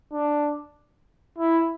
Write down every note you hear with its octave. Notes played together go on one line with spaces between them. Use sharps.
D4
E4